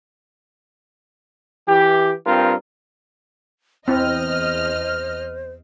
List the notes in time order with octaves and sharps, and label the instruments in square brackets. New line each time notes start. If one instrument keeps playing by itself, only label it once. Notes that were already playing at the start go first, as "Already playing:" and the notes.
[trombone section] E3 G4
G2 C4 F4 A#4
[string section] E2 D#5 F6 [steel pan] C4 E4 [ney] C5